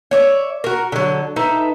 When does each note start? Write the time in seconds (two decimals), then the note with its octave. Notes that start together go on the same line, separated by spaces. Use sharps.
0.11 C#5 D5 E5
0.64 F#4 A#4
0.92 D3 F#3
1.36 D#4 A4 B4 E5